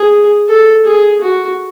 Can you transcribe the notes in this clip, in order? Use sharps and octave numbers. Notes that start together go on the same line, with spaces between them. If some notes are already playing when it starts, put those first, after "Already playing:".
Already playing: G#4
A4
G#4
F#4